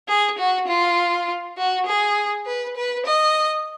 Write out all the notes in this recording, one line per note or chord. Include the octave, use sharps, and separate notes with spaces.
G#4
F#4
F4
F#4
G#4
B4
B4
D#5